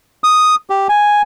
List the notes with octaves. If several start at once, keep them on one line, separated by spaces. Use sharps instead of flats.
D#6
G4
G#5